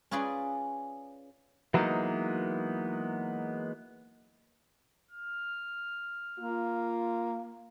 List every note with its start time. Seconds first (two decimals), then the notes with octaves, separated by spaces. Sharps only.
0.11 C#4 F4 G#4 B4 D5
1.74 E3 F#3 G#3 A#3 B3 D#4
5.11 F6
6.40 A#3 F4